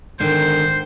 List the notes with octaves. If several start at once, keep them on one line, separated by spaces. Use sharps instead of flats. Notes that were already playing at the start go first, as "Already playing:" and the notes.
G#2 D3 D#3 C5